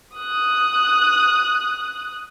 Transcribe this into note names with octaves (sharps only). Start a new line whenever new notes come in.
D#6 F#6